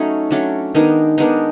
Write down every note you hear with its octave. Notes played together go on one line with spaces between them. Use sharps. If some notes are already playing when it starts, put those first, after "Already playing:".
Already playing: F#3 A3 C#4 D#4
F#3 A3 C#4 D4
D#3 G#3 B3 D4 D#4
D#3 G#3 B3 D4 D#4